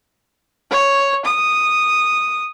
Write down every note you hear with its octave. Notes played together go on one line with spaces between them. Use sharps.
C#5
D#6